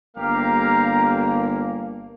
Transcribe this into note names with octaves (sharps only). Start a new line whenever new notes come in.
G1 A#3 G4 F5 A#5